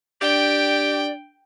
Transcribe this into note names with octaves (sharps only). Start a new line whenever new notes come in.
D4 G4 D5 G5